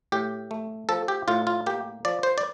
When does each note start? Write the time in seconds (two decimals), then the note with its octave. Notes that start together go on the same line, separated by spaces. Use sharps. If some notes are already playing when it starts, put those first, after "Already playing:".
0.12 A2 G4
0.51 A3
0.89 F3 A4
1.08 G4
1.28 A2 F4
1.47 F4
1.66 A#3 G4
2.05 F3 D5
2.23 C5
2.38 D5